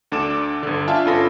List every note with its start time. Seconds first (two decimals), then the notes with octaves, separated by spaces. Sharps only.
0.12 D2 D4 A4 D6 E7
0.63 G1 D3
0.87 D4 F4 E5 F5 G#5 A5
1.05 G1 C#4 F4 A4 B5 A#6